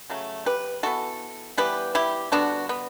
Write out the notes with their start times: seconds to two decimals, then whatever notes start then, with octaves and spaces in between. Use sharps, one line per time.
0.10 C#3 F#3 A3
0.46 G4 B4
0.83 E3 G3 B3 F#4 A4
1.58 E3 G3 B3 G4 B4
1.95 E4 G4
2.32 D3 G3 B3 D4 F#4
2.69 B3